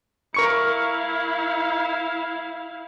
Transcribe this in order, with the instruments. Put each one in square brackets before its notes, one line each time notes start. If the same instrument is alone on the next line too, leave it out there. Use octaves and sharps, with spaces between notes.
[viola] E4 F5 [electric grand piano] A#4 C#6 C#7